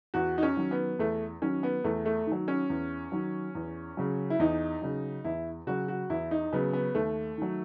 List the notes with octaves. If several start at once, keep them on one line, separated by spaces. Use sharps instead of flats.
E2 F#4
D#4
C#4
D#3 F#3
B3
E2 A3
D#3 F#3 C#4
B3
E2 A3
A3
D#3 F#3
C#4
E2
D#3 F#3
E2
C#3 F#3
E4
E2 D#4
C#3 F#3
E2 E4
C#3 F#3 F#4
F#4
E2 E4
D#4
C#3 F#3 B3
B3
D#2 A3
D#3 F#3